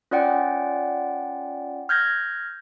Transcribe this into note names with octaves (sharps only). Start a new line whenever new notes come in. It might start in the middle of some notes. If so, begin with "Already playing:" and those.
C#4 F4 D5 F#5 G5
F6 G6 G#6 A#6